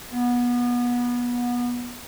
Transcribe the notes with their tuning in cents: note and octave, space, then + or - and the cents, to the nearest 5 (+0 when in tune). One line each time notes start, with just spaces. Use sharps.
B3 -25